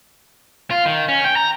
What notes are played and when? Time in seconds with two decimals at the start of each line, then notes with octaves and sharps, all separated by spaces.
0.71 F4
0.86 D#3
1.08 C#4
1.24 G5
1.36 A#5